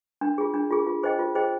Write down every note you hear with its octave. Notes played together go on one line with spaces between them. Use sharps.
D4
F4 G#4
D4
F4 G#4
F4
G#4 C5 D#5 G5
F4
G#4 C5 D#5 G5